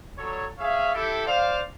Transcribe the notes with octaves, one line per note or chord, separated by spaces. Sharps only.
F#3 G3 A4 C#5
G#4 C#5 E5 F5
E4 G4 A4
C5 D5 F5